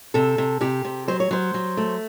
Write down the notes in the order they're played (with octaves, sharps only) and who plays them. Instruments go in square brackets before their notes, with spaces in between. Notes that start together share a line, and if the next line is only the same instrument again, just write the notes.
[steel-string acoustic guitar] C3 A4
C3
C3 G4
C3
F#3 C5
C#5
F#3 C5
F#3
A3